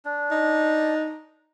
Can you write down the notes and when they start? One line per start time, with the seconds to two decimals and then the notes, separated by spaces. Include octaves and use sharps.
0.05 D4
0.31 D#4